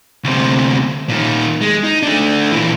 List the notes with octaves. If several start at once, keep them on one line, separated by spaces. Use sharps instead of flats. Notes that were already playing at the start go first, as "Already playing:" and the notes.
D2 C3
A#2 D#3
G#3
D#4
A3 D4
A#2 E3